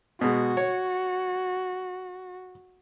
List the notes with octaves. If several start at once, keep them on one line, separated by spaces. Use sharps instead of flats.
B2 G#3 F#4
C#5